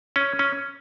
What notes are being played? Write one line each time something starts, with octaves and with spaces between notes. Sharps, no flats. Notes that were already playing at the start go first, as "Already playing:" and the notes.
C#4
C#4